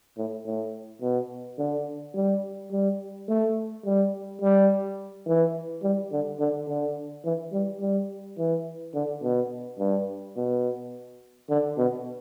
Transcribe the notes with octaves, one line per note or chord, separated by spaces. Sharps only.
A2
A2
B2
D3
G3
G3
A3
G3
G3
E3
G3
D3
D3
D3
E3
G3
G3
E3
D3
B2
G2
B2
D3
B2